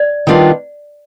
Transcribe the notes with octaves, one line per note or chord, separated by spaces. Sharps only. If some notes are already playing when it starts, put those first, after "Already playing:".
Already playing: D5
D#3 G3 B3 D4 F4